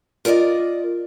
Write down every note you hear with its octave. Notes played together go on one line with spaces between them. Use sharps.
F4 A#4 C5 D5 D#5